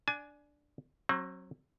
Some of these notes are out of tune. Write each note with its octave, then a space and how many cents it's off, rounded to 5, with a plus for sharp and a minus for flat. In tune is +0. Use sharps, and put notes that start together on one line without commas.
D4 +0 G#5 +25
F#3 +0 C4 +35